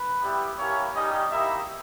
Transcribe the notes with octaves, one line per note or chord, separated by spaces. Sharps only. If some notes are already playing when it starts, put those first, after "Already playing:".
Already playing: B4
G3 B3 E4 G4
A#3 C#4 E4 G4 C#5
G3 C#4 D#4 G4 D#5
A#3 D#4 E4 G4 E5